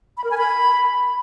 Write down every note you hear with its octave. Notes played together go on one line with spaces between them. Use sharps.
B5
A#4
G#5
B5